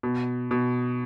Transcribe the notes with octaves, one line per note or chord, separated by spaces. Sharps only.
B2
B2